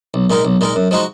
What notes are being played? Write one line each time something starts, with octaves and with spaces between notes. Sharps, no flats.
B1
A#2 G#3 D#4 A#4
B1
A#2 G#3 D#4 A#4
F#2
F3 G#3 D#4 F#4